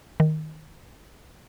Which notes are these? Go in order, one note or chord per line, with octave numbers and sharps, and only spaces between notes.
D#3